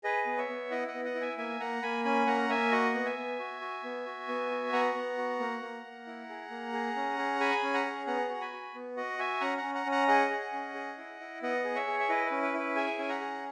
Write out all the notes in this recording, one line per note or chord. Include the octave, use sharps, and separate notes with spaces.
G#4 B4 D#5
B3
C#5 E5
B3
E4 D#5 F#5
D#5 F#5
B3
D#5 F#5
E4
E5 G#5
A#3 E5 G#5
A#3 F#5 A#5
A#3 G#5 B5
C#4 G#5 B5
A#3 F#5 A#5
A#3 E5 G#5
F#4 D#5 F#5
B3
E5 G#5
B3
F#4
F#4
B3
F#4
B3
F#4
B3 F#5 A#5
B3
F#4
A#3
A#3
A#3
E4
G#4
A#3
G#4
C#4
G#4
G#4 G#5 B5
C#4
F#5 A#5
G#4
B3 F#5 A#5
F#4
G#5 B5
F#4
B3
F#4 D#5 F#5
F#4 E5 G#5
C#4 F#5 A#5
F#5 A#5
C#4
F#5 A#5
C#4
F#5 A#5
G#4 D#5 F#5
G#4
C#4
G#4
E4
E4
B3 D#5 F#5
G#4
C#5 E5
G#4
E5
E4 B4 D#5
B4
C#4
B4
E4
B4
G#4 E5 G#5
C#4 G#5
F#5 A#5
G#4